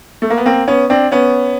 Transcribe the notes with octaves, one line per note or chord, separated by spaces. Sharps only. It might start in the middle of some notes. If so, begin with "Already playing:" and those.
A3
A#3
B3
A#3 C4
B3 C#4
C4 D4
B3 C#4